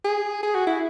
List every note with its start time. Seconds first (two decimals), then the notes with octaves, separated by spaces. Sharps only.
0.04 G#4
0.43 G#4
0.55 F#4
0.67 E4